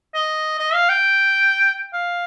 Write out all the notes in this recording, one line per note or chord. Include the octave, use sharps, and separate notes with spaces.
D#5
D#5
F5
G5
F5